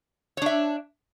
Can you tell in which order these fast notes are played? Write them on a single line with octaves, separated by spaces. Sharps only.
C#5 D4 E5